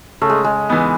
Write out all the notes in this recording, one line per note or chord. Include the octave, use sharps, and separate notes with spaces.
C#3 A3
G#3
G#3
E3 B3 D#4